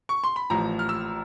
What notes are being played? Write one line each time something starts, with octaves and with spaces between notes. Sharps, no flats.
C#6
C6
B5
A1 A2 F3 A#5
F6
E6